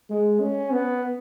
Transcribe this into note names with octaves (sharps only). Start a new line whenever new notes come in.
G#3
C#4
B3